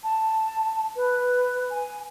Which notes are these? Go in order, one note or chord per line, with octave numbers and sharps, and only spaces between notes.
A5
B4
G#5